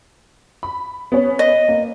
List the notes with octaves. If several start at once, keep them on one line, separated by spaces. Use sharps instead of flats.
B5
B3 C#4
D#5
A#3